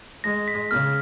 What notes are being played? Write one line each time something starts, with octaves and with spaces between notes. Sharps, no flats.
G#3 A#6
B6
C#3 F6